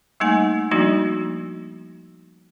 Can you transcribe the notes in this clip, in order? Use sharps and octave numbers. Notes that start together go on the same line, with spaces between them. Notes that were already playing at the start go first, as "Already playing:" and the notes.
G3 A3 A#3 D#4 G#5
F3 G3 A#3 D4 D#4 F#4